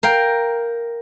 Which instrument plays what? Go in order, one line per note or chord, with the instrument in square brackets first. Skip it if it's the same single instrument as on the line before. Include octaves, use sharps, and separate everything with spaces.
[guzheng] A#4 F5 G5